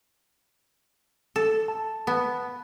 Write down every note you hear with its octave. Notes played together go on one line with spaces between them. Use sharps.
A4
A5
B3